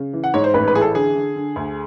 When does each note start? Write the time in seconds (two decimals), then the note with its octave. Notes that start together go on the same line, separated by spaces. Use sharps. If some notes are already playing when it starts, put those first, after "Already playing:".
Already playing: C#3
0.13 E3
0.24 F#5
0.34 G#2 C#5
0.44 C5
0.54 A1 B4
0.68 B4
0.74 E3 G#4
0.81 A4
0.95 D3 G#4
1.15 D3
1.36 D3
1.56 D2